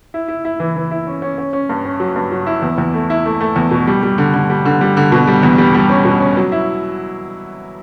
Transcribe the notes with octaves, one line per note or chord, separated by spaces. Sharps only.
E4
E4
E4
E3
E3
E4
C#4
C#4
C#4
C#4
G2
C#4
F#3
G2
F#3
E4
E2
E2
A3
E4
A3
A3
E2
B2
G3
G3
D3
D3
G3
D3
G3
D3
B2
G3
E2
G3
G3
C#4
B2
C#4
F#3
E4